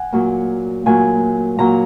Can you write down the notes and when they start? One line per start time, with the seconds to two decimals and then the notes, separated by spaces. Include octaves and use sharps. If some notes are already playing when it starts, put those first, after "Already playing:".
Already playing: F#5 G#5
0.12 A#2 F#3 A#3
0.86 A#2 F#3 A#3 G#5
1.59 A#2 F#3 A#3 A#5